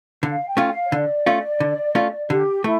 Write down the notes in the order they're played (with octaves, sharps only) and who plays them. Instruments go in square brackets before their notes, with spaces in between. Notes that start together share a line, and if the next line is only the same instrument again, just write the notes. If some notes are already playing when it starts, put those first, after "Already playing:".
[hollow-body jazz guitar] D3 [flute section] F5
[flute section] G5
[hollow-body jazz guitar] A3 C#4 F4
[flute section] F5
C#5
[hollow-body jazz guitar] D3 [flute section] D5
[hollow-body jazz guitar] A3 C#4 F4
D3
A3 C#4 F4
[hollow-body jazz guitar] D3 [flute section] G4
[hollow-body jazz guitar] A3 [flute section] E4